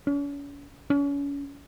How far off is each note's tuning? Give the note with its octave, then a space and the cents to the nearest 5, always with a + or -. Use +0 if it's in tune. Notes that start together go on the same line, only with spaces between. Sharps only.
C#4 +40
C#4 +35